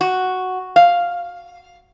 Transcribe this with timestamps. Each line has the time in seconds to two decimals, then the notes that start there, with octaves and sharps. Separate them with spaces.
0.01 F#4
0.76 F5